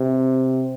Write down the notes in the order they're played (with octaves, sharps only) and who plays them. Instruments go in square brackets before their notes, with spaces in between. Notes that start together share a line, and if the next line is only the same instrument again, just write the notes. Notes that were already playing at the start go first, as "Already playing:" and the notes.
Already playing: [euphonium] C3